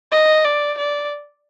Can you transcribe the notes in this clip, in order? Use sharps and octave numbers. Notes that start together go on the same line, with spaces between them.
D#5
D5
D5